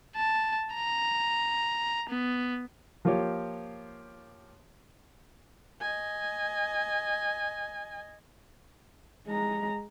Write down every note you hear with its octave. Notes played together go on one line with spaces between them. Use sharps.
A5
A#5
B3
F3 A#3 F4 G4 C#5
D#5 G#5
G#3 A#5